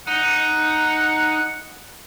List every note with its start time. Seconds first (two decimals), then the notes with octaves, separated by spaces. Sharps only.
0.07 D#4 F#5